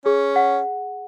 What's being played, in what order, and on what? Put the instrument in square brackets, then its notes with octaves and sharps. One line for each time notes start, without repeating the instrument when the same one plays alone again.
[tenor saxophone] C#4 [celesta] G#4
[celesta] F#5